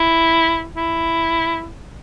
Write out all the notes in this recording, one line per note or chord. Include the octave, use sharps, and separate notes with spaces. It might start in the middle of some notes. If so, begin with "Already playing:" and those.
Already playing: E4
E4